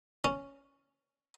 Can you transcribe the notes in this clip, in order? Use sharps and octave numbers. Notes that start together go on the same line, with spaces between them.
C#4